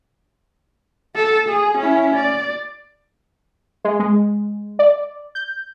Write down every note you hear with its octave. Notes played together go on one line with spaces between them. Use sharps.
A4
G#4
C#4 E4
D5
G#3
G#3
D5
G6